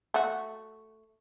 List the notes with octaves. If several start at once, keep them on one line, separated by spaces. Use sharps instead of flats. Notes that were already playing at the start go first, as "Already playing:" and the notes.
A3 F#4